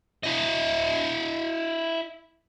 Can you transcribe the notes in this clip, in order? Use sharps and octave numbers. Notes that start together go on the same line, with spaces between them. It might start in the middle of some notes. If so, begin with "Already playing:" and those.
E4 D#5